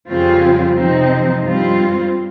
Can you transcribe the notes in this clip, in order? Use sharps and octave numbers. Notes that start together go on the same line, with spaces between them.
F2 C#3 G3 C4 F4
C3 F3 C4 D#4
G2 G3 C4 F4